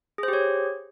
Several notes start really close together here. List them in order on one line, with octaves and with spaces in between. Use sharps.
G#4 C5 G4 C#5